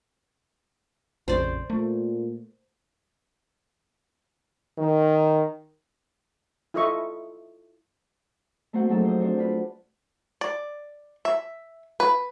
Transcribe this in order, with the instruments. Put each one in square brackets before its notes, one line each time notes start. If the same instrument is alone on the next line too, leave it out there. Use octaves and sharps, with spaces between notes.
[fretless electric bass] A#1 F2 C#3 [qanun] C5 D5
[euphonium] A#2 [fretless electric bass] A3
[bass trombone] D#3
[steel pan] E4 F4 A4 D#5 E5 C#6
[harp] A3 A#3 C4 F#4 C5 F#5
F3 F#3 A3 D#4 G#4 A4
C5 D#6
C4 D4 F#4 C5
D4 F4 B4
[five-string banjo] D5
E5
B4